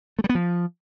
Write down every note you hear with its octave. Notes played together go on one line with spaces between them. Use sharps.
A3
G3
B3
F3